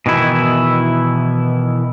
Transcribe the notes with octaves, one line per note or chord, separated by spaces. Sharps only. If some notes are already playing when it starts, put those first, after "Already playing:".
B2 D#3 E3 E4